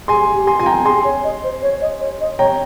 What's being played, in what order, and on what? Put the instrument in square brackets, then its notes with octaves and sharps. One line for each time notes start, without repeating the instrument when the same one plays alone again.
[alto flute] G#4 [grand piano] G#5 C6
[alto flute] G4
[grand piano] G#5 C6
[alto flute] F4 [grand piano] G#5
[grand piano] G5 A#5
[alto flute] G#4 [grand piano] G#5 C6
[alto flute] C#5
D#5
C5
C#5
D#5
C#5
D#5
[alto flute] C#5 [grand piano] G5 A#5